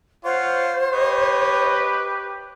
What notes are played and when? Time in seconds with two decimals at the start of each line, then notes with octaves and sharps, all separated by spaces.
0.25 F4 C5 C#5 F5 F#5
0.92 G4 B4 C#5 D#5